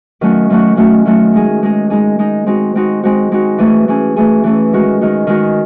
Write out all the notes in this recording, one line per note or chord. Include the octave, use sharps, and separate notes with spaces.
D#3 F#3 A3 C#4 F#4
D#3 F#3 A3 C#4 F#4
D#3 F#3 A3 C#4 F#4
D#3 F#3 A3 C#4 F#4
G#3 D#4 G#4
G#3 D#4 G#4
G#3 D#4 G#4
G#3 D#4 G#4
G#3 C4 D#4 F#4
G#3 C4 D#4 F#4
G#3 C4 D#4 F#4
G#3 C4 D#4 F#4
E3 A3 C#4 G#4
E3 A3 C#4 G#4
E3 A3 C#4 G#4
E3 A3 C#4 G#4
D#3 G#3 D#4 F#4
D#3 G#3 D#4 F#4
D#3 G#3 D#4 F#4